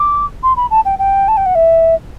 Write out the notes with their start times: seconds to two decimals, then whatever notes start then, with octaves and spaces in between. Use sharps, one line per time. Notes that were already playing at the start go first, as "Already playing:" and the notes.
Already playing: D6
0.43 C6
0.57 B5
0.71 A5
0.85 G5
0.99 G5
1.28 A5
1.37 G5
1.46 F#5
1.55 E5